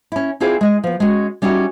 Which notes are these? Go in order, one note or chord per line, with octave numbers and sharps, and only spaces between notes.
C#4 E4
C4 E4 F4 G#4 C5 D5
G#3 D#5
F3 B3
G#3 C#4 F#4
G3 C#4 D#4 E4 F#4